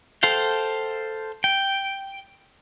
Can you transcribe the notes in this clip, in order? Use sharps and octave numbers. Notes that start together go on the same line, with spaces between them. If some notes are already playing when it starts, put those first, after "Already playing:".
A4 C5 F5 G5
G5